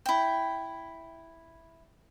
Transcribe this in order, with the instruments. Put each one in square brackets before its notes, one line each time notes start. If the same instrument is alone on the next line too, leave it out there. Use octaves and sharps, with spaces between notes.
[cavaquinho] E4 G5